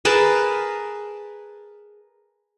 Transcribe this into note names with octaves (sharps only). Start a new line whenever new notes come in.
G#4 A#4 B4 A5